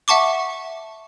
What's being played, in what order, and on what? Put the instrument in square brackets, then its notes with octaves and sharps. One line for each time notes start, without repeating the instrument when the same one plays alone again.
[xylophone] E5 F#5 A5 C#6 D6